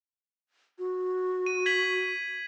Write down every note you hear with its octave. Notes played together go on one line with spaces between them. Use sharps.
F#4
D#7
G#6 B6 F#7